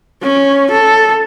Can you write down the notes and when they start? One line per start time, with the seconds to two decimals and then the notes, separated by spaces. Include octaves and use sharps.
0.23 C#4
0.71 A4